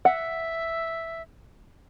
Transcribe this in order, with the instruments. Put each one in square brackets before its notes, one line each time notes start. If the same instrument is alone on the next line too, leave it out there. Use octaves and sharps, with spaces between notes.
[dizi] E5 [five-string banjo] F#5